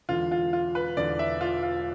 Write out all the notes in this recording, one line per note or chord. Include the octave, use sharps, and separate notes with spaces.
E1 E2 D3 F4
F4
F4
B4
E1 E2 D3 D5
E5
F4
F4